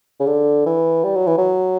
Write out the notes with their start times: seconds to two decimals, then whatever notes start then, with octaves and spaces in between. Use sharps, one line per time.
0.20 C#3
0.26 D3
0.66 E3
1.04 G3
1.15 F#3
1.27 E3
1.38 F#3